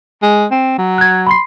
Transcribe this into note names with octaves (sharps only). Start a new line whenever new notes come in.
G#3
C4
F#3
F#6 G#6
B5 C6 C7